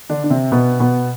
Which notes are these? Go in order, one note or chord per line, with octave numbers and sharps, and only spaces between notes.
D3 D4
D4
C3 C4
B2 B3
B2 B3